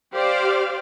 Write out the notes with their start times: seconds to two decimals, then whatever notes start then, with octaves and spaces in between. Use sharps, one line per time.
0.15 G4 C5 D5 F5